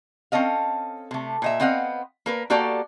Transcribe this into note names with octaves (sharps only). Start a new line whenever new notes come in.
C4 C#4 A4 D#5 F5
C3 A3
A#2 D#5 E5
B3 C4 D#5 F5 F#5
A#3 A#4 B4
A#3 F#4 G4 A4 D5 A#5